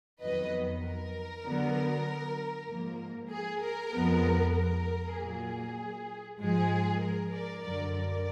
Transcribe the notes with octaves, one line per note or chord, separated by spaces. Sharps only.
F2 D#3 F#3 B3 B4 D#5
A#4
D3 F#3 B3
G#2 F3 A#3
G#4
A#4
F2 F3 G#3 B3
A#4
A#2 F#3 A#3 G#4
G#2 F3 G#3 G#4
A#4
A#4 D5
F#2 D3 F#3 A#4 D5
A#4 D5